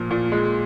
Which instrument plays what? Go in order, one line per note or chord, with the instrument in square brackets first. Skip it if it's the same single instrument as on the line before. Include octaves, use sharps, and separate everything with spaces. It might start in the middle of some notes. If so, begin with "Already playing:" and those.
Already playing: [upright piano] A#2 F3 A#3
A#2
G#3